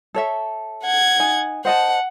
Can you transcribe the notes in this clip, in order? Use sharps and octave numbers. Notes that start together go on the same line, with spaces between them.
A4 C#5 E5
F#5 G#6
D#4 G#5
C5 D#5 F#5 A5